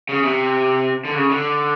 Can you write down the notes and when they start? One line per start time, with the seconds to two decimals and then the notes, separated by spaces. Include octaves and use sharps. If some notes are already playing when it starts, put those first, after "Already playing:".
0.09 C#3
0.24 C3
1.05 D3
1.15 C#3
1.30 D3